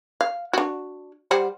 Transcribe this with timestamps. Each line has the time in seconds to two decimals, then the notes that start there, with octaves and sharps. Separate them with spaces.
0.21 F5
0.53 D4 F#4
1.31 G3 C5 F#5